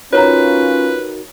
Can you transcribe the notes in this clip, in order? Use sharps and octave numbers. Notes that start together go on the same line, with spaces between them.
C#4 D#4 F4 F#4 A#4 B4 C#5 A#5